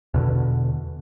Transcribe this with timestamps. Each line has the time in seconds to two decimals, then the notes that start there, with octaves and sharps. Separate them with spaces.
0.14 E2 B2 D3